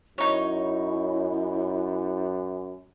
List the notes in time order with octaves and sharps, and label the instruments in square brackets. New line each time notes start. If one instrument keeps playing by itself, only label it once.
[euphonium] F#2 [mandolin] D#4 C#5 [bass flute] E4